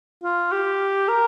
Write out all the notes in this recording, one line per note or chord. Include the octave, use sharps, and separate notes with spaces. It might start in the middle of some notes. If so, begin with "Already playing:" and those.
F4
G4
A#4